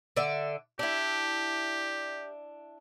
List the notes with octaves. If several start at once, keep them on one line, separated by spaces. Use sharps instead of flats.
D3 D5 E5
D4 E4 G4